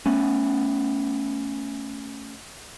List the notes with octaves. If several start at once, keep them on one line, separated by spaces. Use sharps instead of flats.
A3 B3 C#4